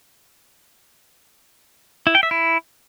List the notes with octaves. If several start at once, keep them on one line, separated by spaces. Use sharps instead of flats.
E4
G5
E5
E4